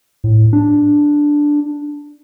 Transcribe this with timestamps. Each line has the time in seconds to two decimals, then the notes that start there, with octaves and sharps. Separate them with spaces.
0.24 A2
0.53 D4